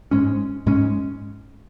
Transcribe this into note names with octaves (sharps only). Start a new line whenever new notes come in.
G#2 G#3 C#4
G#2 G#3 C#4